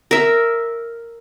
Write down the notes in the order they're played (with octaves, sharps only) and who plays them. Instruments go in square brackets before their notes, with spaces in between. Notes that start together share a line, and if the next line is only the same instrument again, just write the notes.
[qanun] A#4 E5